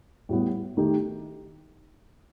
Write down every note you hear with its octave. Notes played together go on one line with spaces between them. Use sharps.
A2 G3 B3
D#3 A3 D#4 G4